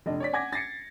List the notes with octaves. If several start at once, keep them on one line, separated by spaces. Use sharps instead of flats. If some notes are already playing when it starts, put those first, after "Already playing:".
F1 D4 D#5
C#5 D5 B6
F#5 G#5 D6 G#6 A#6
A6 A#6 C7 C#7